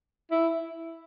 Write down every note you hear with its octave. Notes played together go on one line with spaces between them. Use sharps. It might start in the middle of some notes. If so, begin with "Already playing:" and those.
E4